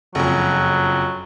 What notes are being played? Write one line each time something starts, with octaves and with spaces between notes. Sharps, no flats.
F#1 F2 F#3